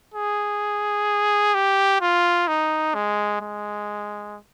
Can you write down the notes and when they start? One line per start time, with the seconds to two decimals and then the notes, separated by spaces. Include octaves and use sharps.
0.14 G#4
1.54 G4
2.01 F4
2.48 D#4
2.94 G#3
3.41 G#3